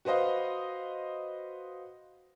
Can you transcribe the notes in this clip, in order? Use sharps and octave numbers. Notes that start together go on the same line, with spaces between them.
F#4 B4 C5 D#5 F5